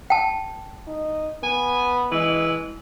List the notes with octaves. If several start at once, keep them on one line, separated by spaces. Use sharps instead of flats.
G5 A5
D#4
B3 G#5
E3 G#3